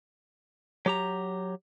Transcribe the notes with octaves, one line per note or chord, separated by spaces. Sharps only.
F#3 G4 A#5